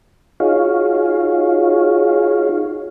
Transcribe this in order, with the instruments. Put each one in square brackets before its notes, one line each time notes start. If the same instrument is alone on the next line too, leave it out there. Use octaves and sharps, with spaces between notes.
[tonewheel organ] D#4 F4 F#4 G#4 C#5 F5